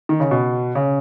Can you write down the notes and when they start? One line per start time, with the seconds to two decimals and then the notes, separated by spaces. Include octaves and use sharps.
0.09 D#3
0.20 C#3
0.31 B2
0.75 C#3